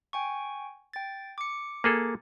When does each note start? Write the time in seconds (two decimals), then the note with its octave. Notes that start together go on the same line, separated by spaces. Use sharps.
0.13 G5 G#5 C#6
0.93 G5 A6
1.38 D6 C#7
1.84 A#3 G#4 A4